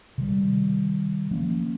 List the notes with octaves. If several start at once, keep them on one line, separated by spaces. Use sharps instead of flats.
C3 D#3 G3
F3 A#3 C#4